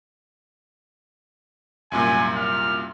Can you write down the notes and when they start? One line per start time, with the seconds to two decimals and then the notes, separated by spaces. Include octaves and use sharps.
1.92 C2 F#2 A#2 G#5
2.35 F6